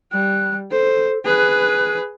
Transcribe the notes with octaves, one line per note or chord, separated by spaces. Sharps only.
G3 F#6
A4 C5
G#4 B4 F#6